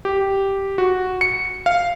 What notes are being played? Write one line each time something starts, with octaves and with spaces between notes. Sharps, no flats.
G4
F#4
C#7
F5